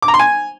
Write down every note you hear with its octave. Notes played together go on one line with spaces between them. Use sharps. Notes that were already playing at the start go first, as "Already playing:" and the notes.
D6
A#5
C6
G#5